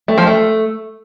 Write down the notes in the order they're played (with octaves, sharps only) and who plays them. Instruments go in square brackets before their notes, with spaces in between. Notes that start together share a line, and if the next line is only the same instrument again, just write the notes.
[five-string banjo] A3
F3
A3